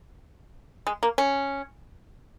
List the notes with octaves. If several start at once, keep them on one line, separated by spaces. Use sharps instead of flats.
G#3
A#3
C#4